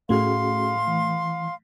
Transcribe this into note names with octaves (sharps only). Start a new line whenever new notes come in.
A2 A3 C#4 F#4 G#4 F5 C6
E3